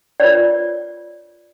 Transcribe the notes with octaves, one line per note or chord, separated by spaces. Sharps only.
F4 A#4 B4 C#5 D5